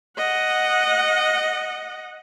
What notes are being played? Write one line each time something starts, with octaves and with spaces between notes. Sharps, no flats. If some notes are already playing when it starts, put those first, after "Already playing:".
D#5 F#5